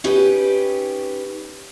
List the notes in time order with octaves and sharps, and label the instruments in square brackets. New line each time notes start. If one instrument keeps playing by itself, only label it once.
[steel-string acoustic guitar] C#4 D#4 G4 B4